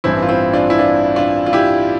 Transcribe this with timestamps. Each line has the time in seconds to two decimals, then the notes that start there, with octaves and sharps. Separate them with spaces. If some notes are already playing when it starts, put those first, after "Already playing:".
0.04 A1 G2 E3 C4 E4
0.23 F4
0.29 C4 E4
0.53 D4 F4
0.70 E4
0.79 D4 F4
1.16 D4 F4
1.46 F4
1.53 E4 G4